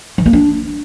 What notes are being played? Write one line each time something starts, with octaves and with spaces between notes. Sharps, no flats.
E3
A#3
D4